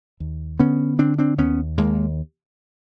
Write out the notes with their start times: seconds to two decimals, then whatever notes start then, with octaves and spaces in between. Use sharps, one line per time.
0.20 D#2
0.60 D3 B3 C#4
0.99 D3 C4 D4
1.19 C4 D4
1.38 D#2 B3 C#4
1.78 D#2 G#3 A#3